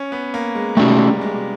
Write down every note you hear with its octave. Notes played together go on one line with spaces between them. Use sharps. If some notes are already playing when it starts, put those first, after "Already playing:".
Already playing: C#4
B3
A#3
G#3
G3 A3 C#4 F#4
G#3